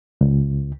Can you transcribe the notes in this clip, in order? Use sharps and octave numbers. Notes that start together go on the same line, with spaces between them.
C#2